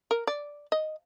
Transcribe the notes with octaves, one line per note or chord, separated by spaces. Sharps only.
A#4
D5
D#5